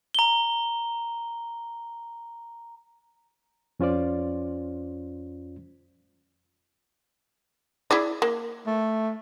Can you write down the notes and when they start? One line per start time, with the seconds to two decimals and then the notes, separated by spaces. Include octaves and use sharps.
0.15 A#5 G7
3.80 F2 C#4 F4 C5 D5
7.91 E4 G#4 D5
8.22 A#3
8.67 A3